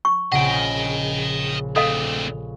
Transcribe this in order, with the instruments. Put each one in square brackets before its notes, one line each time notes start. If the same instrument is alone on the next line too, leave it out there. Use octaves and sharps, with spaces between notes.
[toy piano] C#6
[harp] A#1 C#3 [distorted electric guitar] D#5 G5 [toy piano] F#5
[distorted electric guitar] D2 C3 [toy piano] A4 D#5 F5